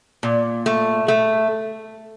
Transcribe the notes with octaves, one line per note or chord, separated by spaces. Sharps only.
A#2
A3
A3